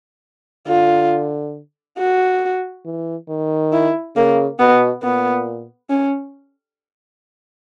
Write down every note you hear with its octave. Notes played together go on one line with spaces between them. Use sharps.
D3 F4
F#4
E3
D#3
E4
C#3 A#3
B2 B3
A#2 B3
C#4